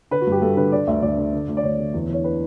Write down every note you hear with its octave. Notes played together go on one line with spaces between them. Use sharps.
D3 B4
F#4
G2
G4
G2 A4
D3 B4
D3 D5
D2 E5
D2 D5
D3
D3
D2
D5
D2 C#5
D3
E2
E3 C#5
B4